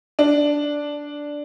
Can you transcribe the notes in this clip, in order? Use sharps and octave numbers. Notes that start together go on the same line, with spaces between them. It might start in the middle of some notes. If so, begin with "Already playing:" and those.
D4